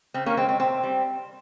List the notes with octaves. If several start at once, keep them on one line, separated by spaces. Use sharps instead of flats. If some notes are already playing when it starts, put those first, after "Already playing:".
C#3 C4
A#3 C#4
G#3 C4
C4
C3 C4
G3